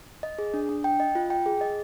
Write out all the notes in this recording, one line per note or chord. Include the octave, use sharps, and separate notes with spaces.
D#5
G#4
D4
D4
G5
D#5
F4
G5
G#4
D#5